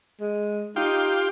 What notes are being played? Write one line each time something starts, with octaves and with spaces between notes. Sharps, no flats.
G#3
D#4 F4 G4